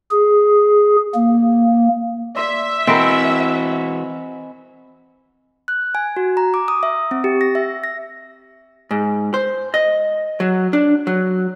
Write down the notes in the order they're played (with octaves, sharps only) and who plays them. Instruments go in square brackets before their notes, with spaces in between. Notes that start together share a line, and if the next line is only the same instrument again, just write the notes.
[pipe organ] G#4
A#3
[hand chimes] D5 C6 [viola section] E5
[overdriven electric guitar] E3 F#4 [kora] C4 A#4 [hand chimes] D#5 G#5 B5
[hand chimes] F#6
G#5
F#4
A#5
D6
D#6
E5
C4
G4
A#6
E5
A#6
[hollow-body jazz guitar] G#2
C5
D#5
F#3
D4
F#3